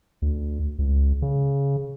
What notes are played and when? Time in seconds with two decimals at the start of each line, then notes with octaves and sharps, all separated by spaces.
0.22 D2
0.79 C#2
1.22 C#3